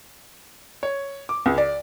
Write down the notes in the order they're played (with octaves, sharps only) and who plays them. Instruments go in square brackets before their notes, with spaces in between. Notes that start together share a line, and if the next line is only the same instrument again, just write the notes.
[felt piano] C#5
D6
C#2
D5